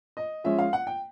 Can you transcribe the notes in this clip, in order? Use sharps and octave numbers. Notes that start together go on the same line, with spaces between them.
D#5
F3 G#3 C#4 E5
F5
F#5
G5